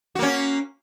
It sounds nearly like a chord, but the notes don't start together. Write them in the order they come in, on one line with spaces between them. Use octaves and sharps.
F#4 A#3 C#4